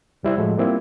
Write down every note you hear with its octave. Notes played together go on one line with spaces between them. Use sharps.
C2 G3 E4 C5
A2 F3 F#3 G#3 A3
G3 A#3 C4 E4 F4